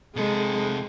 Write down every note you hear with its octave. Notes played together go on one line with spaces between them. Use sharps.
C3 G#3 A4